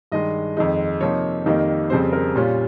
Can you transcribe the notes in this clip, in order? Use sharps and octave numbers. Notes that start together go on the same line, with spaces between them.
G2 D#3 G#3 D#5
F2 D#3 G#3 D#4
C3 F3 A#3 D#4 C#5
F2 D#3 G3 A#3 D#4
F2 C#3 G3 C4 C5
A#4
A#2 G3 C#4 F4